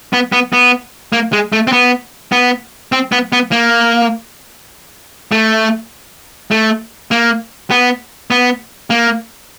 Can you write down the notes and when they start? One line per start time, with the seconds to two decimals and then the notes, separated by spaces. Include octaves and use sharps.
0.13 B3
0.32 B3
0.53 B3
1.13 A#3
1.33 G#3
1.52 A3
1.67 C4
1.72 B3
2.32 B3
2.92 C4
3.12 B3
3.32 B3
3.52 A#3
5.32 A3
6.51 A3
7.11 A#3
7.71 B3
8.31 B3
8.90 A#3